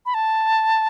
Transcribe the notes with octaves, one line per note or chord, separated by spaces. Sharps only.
B5
A5